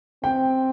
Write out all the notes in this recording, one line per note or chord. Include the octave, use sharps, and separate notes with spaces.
C4 G5